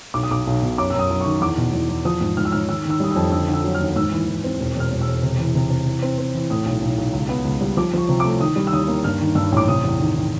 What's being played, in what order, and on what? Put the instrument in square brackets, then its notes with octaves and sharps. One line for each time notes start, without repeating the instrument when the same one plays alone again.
[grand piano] B1 D6
D#6
B1 D6
B1
B2
F#2 D6
F#2 E6
D#6
F#2
D#3 C#6
E2 D6
B2
E2
E2
F3 D#6
G#2
G#2 F6
E6
G#2 F6
D#3 E6
D#3 E6
G3 D#6
E6
F2
D3 E6
D3
E6
F#3
F6
D#2
G#2 E6
E3
E3
C4
E1
E1 F6
E1
E6
E1
C3
E3
C3
C3
E3
C4
C4
E3
A2 D#6
B1
B1
B1
C#2
B3
C#2
G3
F3 D6
F3 C#6
C3
A3 D6
D#3 D#6
G3
E6
D#2 D#6
A#3
G2 F6
D#3
G2 E6
A1 D6
C3 D#6
E2
D#3
D#3